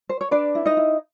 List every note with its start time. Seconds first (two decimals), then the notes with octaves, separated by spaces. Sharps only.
0.09 C5
0.21 C#5
0.31 D4 B4 D5
0.55 E4
0.66 D#4 D#5
0.77 E4